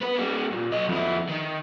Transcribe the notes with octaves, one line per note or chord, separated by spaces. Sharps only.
B3 B4
G3 A#3
A#2
B1 D#5
F2 E4
D#3